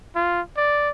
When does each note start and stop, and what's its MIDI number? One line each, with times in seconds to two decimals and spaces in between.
0.16 0.41 65
0.57 0.90 74